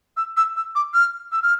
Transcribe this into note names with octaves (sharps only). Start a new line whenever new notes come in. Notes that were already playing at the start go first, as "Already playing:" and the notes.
E6
E6
E6
D6
F6
E6
F6